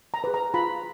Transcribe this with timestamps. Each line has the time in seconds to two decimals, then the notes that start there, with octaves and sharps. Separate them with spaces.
0.14 A#5
0.24 G#4 B4
0.34 A#5
0.54 F4 B5